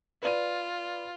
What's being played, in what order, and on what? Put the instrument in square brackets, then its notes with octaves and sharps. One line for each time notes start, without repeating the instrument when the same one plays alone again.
[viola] F4 [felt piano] B4 D5 D#7